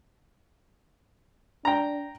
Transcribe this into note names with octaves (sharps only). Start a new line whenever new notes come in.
D4 G5 A#5